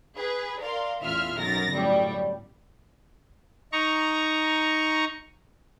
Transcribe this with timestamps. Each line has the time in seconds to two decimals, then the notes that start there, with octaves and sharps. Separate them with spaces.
0.16 G#4 B4
0.61 A#4 D5 F5 C6
1.01 A1 E2 F4 E5 F6
1.38 B1 F#2 A#4 A6 A#6
1.71 G1 F#2 A2 G3
3.72 D#4 A#5 C#6